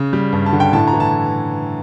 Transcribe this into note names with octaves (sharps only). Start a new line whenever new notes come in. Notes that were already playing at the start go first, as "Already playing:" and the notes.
Already playing: C#3
G3
G2
A5
D3
G5
A2 A5
A#5
E3
A5